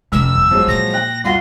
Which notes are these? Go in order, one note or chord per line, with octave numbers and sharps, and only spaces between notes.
F1 C3 C#4 E6 F6
G1
F3 F#3 G#3
A#2 A#6
G5 F#6
C2 F4 F#4 C6